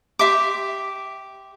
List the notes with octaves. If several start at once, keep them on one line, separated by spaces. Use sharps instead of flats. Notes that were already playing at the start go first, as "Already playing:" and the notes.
G4 E5 C6 D6